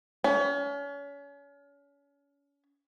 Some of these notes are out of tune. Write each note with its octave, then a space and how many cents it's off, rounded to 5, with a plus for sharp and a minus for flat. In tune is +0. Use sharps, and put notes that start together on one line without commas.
C#4 +35